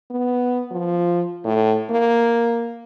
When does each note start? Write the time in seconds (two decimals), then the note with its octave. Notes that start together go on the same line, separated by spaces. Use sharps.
0.11 B3
0.71 F3
1.44 A2
1.90 A#3